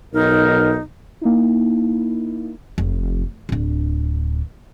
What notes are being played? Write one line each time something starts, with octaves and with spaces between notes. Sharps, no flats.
B1 D#4 A#4
A#3 D#4 E4
F1
D1 D4